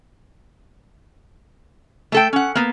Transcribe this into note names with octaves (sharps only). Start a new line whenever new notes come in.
A3 A4 G5
C#4 F#5
A#3 B3